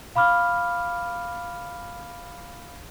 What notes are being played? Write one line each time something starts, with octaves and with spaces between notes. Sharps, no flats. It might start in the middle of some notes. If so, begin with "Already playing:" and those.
F5 B5 D6 F6